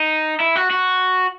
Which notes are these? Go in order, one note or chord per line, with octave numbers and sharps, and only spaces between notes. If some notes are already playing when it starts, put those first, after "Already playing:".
Already playing: D#4
E4
F#4
F#4